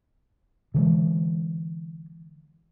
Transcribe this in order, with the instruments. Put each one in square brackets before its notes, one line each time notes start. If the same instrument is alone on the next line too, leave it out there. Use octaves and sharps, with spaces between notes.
[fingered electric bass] D3 E3 G#3